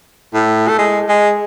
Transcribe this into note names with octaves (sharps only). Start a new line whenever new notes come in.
A2
A3
G#3
G#3